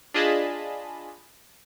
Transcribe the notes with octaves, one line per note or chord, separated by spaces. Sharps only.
D4 F4 G#4 D#5 A5 B5